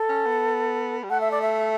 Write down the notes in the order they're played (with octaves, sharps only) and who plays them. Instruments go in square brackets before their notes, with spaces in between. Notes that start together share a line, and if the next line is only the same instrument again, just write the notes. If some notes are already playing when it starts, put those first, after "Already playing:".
Already playing: [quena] A4
[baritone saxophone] C#4
B3
G3
[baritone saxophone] A3 [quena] F#5
[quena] E5
D5
E5